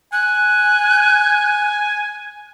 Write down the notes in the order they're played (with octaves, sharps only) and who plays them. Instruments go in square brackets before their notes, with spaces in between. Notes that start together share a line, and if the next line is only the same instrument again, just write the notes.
[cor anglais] G#5 [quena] F#6